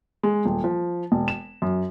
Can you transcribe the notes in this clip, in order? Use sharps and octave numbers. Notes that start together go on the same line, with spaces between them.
G#3
D#1
F3
E1
E7
F#2